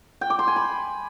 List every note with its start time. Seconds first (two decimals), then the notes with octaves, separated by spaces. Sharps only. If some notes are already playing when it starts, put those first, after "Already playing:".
0.21 G5
0.30 D6
0.39 C6
0.48 G#5
0.56 B5